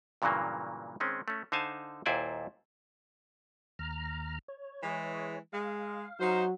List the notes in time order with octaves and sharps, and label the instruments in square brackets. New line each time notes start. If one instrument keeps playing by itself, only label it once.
[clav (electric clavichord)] G2 A#2 C#3 E3 F#3 A#3
D#3 G#3 C4 C#4
A3 C#4
D3 D#4 C5 F5 G#5 A5
D#2 A#2 E4 C5 D5 G#5
[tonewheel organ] D#2 A#5 F6
C#5
[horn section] E3 G#3
[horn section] G#3 [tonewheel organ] F5
[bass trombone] F#3 [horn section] D#4 C5